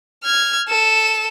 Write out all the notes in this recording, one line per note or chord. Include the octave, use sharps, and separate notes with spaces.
F6 G#6
A4 E7